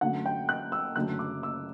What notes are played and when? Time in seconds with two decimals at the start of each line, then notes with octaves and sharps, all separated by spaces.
0.01 F#2 D3 F#3 A3 F#5
0.26 G5
0.49 F#6
0.72 E6
0.96 F#1 F#2 D3 F#3 A3 F#6
1.19 D6
1.43 E6